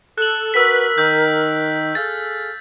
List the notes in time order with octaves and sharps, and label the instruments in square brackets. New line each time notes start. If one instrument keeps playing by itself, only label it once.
[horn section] A4 [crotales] F#6 F#7
[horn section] F#4 B4 [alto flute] A#4 [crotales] E6 B6
[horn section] D#3 [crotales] E6 G6
[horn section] G#4 A4 F5 [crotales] A6